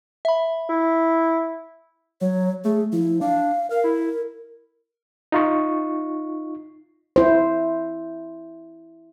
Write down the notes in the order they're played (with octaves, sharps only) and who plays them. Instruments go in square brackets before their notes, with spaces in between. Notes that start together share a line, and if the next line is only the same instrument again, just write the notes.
[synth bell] E5 B5
[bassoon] E4
[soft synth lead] F#3 [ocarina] C#5
[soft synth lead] A3 [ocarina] G#4
[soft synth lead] F3 [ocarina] E4
[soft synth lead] D4 [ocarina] F5
[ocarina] A#4 [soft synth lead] F5
[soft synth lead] E4
[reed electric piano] D#4 F4 C#6
[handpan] E4 C5